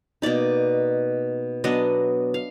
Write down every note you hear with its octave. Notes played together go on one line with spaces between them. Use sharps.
B2 A#3 D#4 D5
F#3 B3 D4 D#5
F5